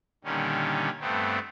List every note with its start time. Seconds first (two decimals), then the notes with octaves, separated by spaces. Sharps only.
0.24 A#2 D3 D#3 G3 C#4
1.00 G2 A3 B3 C4